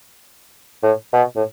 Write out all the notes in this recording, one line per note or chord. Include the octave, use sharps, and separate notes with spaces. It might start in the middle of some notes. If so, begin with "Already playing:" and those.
A2
B2
A2